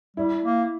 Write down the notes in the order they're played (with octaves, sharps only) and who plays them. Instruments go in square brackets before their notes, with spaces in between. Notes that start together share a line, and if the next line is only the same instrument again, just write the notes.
[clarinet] G3 [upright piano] E4
[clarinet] A#3